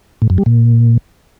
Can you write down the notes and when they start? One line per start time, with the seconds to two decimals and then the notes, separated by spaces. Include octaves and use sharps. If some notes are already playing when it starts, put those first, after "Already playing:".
0.22 A2
0.30 F#2
0.38 G3
0.46 A#2